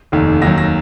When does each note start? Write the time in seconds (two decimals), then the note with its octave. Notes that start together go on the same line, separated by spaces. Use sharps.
0.12 F1 D#2 D#3
0.42 D#2 D#3 F#3 A#6
0.58 A#6